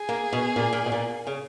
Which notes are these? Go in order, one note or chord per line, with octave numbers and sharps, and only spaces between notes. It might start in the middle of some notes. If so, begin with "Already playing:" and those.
Already playing: G#4
A#3
B2
A#2
A#2
B2
A#2
C#3